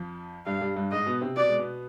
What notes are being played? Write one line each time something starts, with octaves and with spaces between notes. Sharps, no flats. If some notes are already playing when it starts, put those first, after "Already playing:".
Already playing: F2 F3
G2 G3 F5
G2 G3
G2 G3
G#2 G#3 D#5
B2 B3
C3 C4
B2 B3 D5
G#3
B2 B3